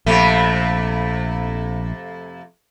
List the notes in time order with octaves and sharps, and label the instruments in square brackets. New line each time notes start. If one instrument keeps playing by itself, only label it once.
[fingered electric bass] A#1 [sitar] F2 C3 A3